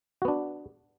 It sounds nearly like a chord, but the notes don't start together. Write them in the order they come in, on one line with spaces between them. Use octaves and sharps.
F#4 B3 D4